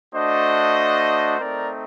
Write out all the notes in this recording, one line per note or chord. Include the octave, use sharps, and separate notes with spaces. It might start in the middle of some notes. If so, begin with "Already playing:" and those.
A3 D4 F#4 C5 D#5
A3 C4 D#4 A#4 D5